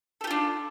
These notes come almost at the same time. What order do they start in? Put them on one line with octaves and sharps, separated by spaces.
A4 G4 F4 D4